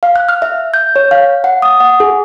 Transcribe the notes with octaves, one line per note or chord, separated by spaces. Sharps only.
F5
F#6
F6
E5
G6
C#5
F5
F#5
D#6
F#5
G#4